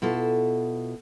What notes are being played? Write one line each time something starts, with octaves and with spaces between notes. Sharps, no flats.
B2 E4 F4 A4